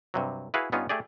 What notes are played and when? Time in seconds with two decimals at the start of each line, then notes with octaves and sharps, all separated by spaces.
0.14 G2 C3 F#3
0.54 E4 F#4 G#4 B4 F5
0.72 G2 B3 C#4 D#4 F4
0.89 A3 G4 G#4 D5